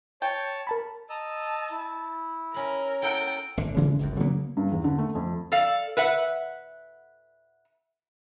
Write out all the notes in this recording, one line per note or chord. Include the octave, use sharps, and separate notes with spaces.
C#5 G5 A5
A#4 A5 B5
D#5 A5 A#5 E6
E4
C#4 A#4 B5
E4 A4 F#5 G5
G#1 D3
C#3 E3 G#3 A#3
G1 C#2 F#2
C#3 F#3 A#3 B3
G2
E2
D3
A3
F2
A4 D5 F5
B4 E5 F#5